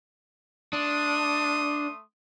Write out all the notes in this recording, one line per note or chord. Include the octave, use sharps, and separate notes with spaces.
A3 D4 C6 D#6